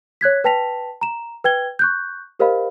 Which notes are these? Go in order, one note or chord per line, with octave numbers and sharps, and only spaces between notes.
C#5 F#6 G#6 B6
B4 G5 A5 A#6 B6 F7
A#5 E7
B4 G5 G#6 G7
C#6 F#6 G6
G4 A#4 C5 D#5 F5 B5